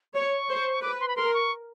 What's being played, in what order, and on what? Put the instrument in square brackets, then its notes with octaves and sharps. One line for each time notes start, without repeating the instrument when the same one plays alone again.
[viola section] C#5 [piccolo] C#6
[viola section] C5
[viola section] B4 [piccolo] D6
[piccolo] C6
B5
[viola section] A#4 [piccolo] C6
[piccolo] C#6